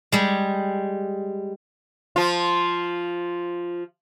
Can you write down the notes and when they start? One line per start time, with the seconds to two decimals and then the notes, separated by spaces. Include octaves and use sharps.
0.12 G3 G#3
2.16 F3 F4